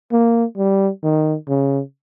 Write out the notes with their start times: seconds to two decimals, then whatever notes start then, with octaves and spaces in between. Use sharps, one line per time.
0.12 A#3
0.57 G3
1.03 D#3
1.49 C#3